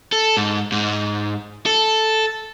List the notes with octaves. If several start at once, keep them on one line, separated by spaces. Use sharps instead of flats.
A4
G#2
G#2
A4